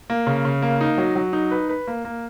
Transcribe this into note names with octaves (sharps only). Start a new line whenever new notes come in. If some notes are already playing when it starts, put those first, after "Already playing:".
A#3
C#3
C#3
A#3
D#4
F#3
F#3
D#4
B4
B4
A#3
A#3